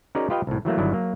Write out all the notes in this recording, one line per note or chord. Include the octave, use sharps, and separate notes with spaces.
C#4 D#4 F#4 G#4 A#4 D5
F4 G4 B4 D#5 F5 G5
C2 A2
E3 F#3 A3 A#3
G1 D#3 F#3 D4 E4 D5
F#3 A#3